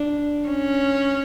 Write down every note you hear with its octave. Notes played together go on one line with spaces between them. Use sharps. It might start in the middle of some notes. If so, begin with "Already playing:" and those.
Already playing: D4
C#4